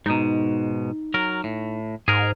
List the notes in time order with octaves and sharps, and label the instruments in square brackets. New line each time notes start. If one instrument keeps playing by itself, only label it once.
[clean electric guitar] G#2 B2 [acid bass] D#4
[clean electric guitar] F#3 A#4
A2
[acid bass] G#2 [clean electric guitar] G#4 A#4